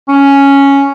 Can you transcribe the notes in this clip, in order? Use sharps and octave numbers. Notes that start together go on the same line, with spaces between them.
C#4